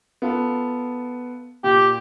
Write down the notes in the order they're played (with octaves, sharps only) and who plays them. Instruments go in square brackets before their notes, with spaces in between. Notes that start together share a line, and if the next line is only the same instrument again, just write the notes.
[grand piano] B3 F4 A4
[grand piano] A#2 [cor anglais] G4